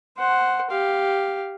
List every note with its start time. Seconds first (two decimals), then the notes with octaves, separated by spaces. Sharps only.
0.17 C5 F#5
0.70 G4 F5